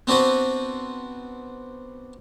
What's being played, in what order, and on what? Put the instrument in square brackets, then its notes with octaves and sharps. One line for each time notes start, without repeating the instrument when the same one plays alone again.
[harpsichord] B3 C4 D4 F#4 B4 C5